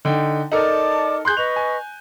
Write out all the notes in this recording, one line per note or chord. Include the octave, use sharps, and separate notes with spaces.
D3 D#4 G5
D#4 A4 A#4 D5 A5 D6
G#4 C6 F#6 G6
B4 D#5 C#6 F7
G#5